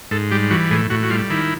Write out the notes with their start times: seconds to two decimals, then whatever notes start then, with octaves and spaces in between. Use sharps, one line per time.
0.11 G#2 A4
0.31 G3 G4
0.50 E3 F#4
0.71 A2 G#4
0.90 A2 F#4
1.03 F#4
1.10 G3 F4
1.30 D#3 E4